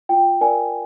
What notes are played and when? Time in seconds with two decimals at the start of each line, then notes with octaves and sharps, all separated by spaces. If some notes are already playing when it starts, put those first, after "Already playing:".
0.09 F4 G5
0.41 A#4 D5 G#5